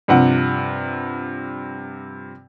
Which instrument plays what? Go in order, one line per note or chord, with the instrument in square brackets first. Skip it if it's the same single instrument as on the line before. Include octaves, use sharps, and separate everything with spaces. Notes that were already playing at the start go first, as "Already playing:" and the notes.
[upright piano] G2 C3 F3 F#5